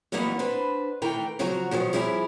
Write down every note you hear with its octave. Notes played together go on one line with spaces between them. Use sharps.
E2 F#3 G3 A#3 B3 D#4
D4 B4 C5
D#3 E3 A3 A#4 G5
C#3 F3 F#3 F#4 C#5 A#5
B2 D#3 F3 F#3
F3 G3 E4 G#4 A#4